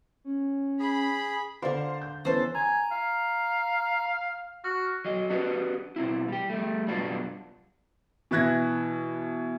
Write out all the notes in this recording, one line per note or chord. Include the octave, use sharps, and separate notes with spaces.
C#4
G#4 B5
D3 A#4 C5 D5 F5
G6
E3 B3 C#4 A4 C5
G#5 A#5
F5
F#4 F6
F#3 D#5
D4 F#4 G4 B4
B2 C4 E4
G3 G4
G3 A3
F#2 B2 G3 B3 D4 F4
B2 E3 E5 F#6 G#6 A#6